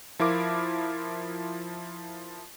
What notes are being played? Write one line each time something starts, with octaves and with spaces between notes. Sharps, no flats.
F3 E4 F4 A#4 D6